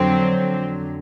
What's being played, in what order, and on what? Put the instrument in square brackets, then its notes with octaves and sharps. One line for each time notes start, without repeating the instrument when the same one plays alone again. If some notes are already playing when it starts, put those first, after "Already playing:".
Already playing: [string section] F2 D3 F#3 C4